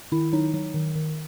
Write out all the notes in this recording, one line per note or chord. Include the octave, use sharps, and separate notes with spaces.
D#3 E4
F#3 D#4
F#3
D#3
D#3